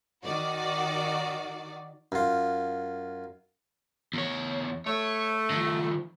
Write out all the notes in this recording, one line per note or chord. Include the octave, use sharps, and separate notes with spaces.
D#3 F#4 D5
F#2 F4
E2 C#5
A3 C#5
D#3 F3